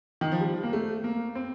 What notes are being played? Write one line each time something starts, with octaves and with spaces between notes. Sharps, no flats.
D#3
F3
G3
A#3
A3
A#3
C4